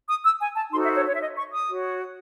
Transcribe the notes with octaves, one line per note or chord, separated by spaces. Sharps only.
D#6
E6
G#5
A5
D#4 F#4 A4 C5 C6
E5
C#5
C#5
E5
D#5
C#6
D#6
F#4 C#5